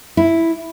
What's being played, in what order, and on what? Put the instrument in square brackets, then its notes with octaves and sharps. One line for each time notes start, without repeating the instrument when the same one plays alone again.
[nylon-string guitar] E4